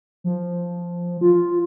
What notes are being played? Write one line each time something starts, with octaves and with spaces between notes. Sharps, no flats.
F3
F4